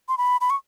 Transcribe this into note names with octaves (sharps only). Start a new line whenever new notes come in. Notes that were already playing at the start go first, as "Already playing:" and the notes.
C6
B5
B5
C#6